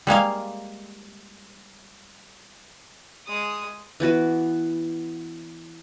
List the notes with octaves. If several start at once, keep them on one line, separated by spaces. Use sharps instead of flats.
G3 G#3 A#3 F5
G#3 D#6
E3 B3 F#4 B4